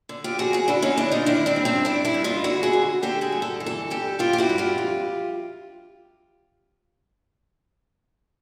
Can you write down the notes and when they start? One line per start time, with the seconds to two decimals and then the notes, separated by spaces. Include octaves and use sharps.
0.09 D3
0.24 F4 G4
0.38 F2 F#4 G#4
0.53 F#4 G#4
0.68 D3 D4 E4
0.82 C#4 D#4
0.97 D3 D4 E4
1.12 D#4 F4
1.26 D#3 D4 E4
1.46 C4 D4
1.56 G2
1.65 C4 D4
1.85 G2 D4 E4
2.05 D4 E4
2.14 G2
2.24 D#4 F4
2.44 D3 E4 F#4
2.63 F#4 G#4
2.73 D3
3.02 D3 G4 A4
3.21 F#4 G#4
3.32 G2
3.42 A4
3.60 E3
3.66 A4
3.90 G2 G4 A4
4.19 G2 F4 G4
4.33 G4
4.38 E4 F#4
4.49 G2
4.58 F4 G4
4.78 F2